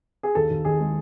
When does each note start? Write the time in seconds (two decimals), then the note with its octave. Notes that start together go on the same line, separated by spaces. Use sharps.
0.23 G#4
0.35 D#2 A4
0.50 D#2
0.65 D#3 G#4
0.80 G#3